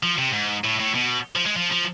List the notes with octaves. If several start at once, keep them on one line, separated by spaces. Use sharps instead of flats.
F3
C3
G#2
A2
A2
B2
F3
G#3
F3
F3